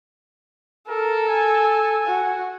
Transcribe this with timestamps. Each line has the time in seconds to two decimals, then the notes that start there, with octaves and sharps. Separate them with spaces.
0.89 A4 A#4
1.29 G#5
2.07 F#4